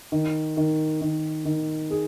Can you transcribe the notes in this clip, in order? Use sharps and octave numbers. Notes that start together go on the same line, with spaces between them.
D#3
D#3
D#3
D#3
G#4